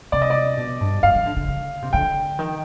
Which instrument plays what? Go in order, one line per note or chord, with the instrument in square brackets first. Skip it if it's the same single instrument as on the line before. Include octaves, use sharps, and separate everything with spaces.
[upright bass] C3 [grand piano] D5
[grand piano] D#5
D5
[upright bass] B2
G2
[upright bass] G2 [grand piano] F5
[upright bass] D#3
D3
D3
D3
C3
[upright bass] D3 [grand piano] G5
[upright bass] D#3